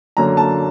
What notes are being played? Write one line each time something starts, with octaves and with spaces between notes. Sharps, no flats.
F#2 D3 F#3 A#3 A#5
A5